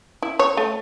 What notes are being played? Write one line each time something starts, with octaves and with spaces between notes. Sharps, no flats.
E4
C#5
A3